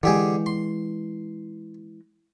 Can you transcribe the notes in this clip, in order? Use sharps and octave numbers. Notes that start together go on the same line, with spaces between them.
D3 E3 G#3 G4 G#4
C6